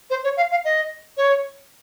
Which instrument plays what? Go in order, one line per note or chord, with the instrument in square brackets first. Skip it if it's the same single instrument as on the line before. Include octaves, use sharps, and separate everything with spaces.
[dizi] C5
C#5
F5
F5
D#5
C#5